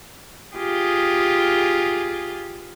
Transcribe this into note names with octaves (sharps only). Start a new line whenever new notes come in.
F4 G4 G#4